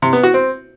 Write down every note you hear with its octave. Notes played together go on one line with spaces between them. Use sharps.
C3
B3
F#4
C4